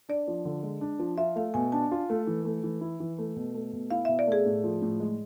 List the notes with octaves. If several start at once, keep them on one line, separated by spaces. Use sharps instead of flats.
D4 D5
F3
D3
G#3
D4
F3
F4 E5
A3 F5
B2 G#5
D4 A5
F4
A3
E3
A3
E3
E4
E3
A3
B2
A3
B2
E4 F5
B2 E5
D5
A3 G#4
A2
F3
A2
G#3